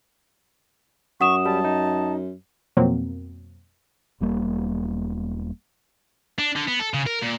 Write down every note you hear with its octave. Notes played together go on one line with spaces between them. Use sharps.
F#2 F#5 C#6 D#6 E7
G3 A5
D#4
F2 B2 F#3 A#3 C4
E1 G3 A#3
D4
D3
B3
A4
C#3
A#4
A#2